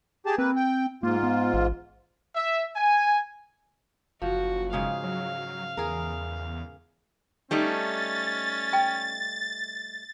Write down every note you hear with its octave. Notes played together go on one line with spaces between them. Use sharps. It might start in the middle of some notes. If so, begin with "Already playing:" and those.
G4 G#4 A5
A#3 C4 B4
G5
G#2 A#3 F4
B3
A1
E5
G#5
F#1 F3 F#4
G#2 C#3 G#4 F5
F#3
E2 G#4 A#4
G3 A3 C#4 D#4 A6
G5